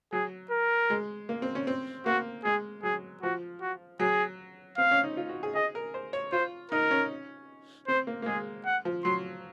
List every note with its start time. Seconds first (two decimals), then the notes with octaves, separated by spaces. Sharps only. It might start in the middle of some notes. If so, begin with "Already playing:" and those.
0.12 F#3 G#4
0.51 A#4
0.90 G#3
1.29 A#3
1.42 C4
1.55 C#4
1.67 C4
2.06 A#3 F#4
2.44 G#3 G#4
2.83 F#3 G#4
3.23 F3 F#4
3.61 F#4
4.00 F#3 G#4
4.78 C4 F5
4.91 C#4
5.04 D#4
5.17 F4
5.29 F#4
5.43 G#4
5.55 G#4 D#5
5.75 A#4
5.94 C5
6.13 C#5
6.32 F4 C5
6.71 D#4 A#4
6.91 C#4
7.88 C4 C5
8.07 A#3
8.22 A#3
8.26 G#3 G#4
8.66 F#5
8.85 F3
9.04 F#3 C6